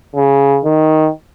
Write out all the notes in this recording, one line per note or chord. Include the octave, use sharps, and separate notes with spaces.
C#3
D#3